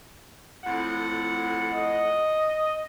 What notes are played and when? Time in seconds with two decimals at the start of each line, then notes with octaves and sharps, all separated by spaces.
0.64 F2 A2 F#5
1.72 D#5